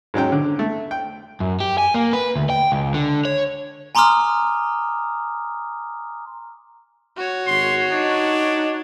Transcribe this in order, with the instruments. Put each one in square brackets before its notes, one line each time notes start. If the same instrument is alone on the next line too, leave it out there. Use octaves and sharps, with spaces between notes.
[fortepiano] G#2 F#3 C#4 G5
D3
A3
G5
[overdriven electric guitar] F#2
G4
G#5
A#3
B4
D2
G5
C#2
D3
C#5
[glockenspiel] G#5 A#5 C6 D6 D#6 F6
[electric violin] F#4 C#5
[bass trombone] G#1 [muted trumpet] C6
[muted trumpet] D4 [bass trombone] D#4